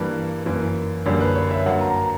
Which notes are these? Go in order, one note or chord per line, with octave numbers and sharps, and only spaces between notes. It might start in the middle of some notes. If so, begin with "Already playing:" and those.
Already playing: G2 E3 G3 A#3
F#2 E3 A#3
F#2 D3 G3 A#3 C#5
B4
C#5
E5
G2 F#3 A#3 F#5
A#5
A#5